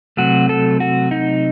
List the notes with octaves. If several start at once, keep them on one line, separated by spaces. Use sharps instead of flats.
C3 F#3 A3 F#4
A4
F#4
D#4